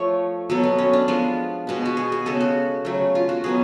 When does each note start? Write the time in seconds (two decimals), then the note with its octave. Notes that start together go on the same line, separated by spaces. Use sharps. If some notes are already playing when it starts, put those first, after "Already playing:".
Already playing: F3 A3 C#5 F5
0.50 B2 F#3 B3 A4
0.64 B3
0.78 C#4
0.93 D4
1.08 F3 G#3 B3 F4
1.67 B2 G#3 B3
1.86 F#4
1.97 G#4
2.12 G#4
2.26 C#3 G#3 B3 A4
2.40 F#4
2.85 C#3 F#3 A3
3.15 F4
3.29 F#4
3.44 B2 F#3 B3 G#4